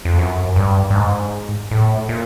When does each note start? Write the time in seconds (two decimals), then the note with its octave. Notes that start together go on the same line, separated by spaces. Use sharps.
0.05 F2
0.19 F#2
0.56 G2
0.90 G2
0.95 G#2
1.71 A2
2.09 A#2